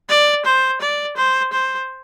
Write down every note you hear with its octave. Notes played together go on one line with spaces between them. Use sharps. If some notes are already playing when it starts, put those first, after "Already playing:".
D5
C5
D5
C5
C5